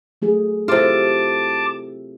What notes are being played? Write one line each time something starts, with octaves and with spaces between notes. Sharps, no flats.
F#3 A3 G#4
C3 E4 F4 G4 A4 A5 D6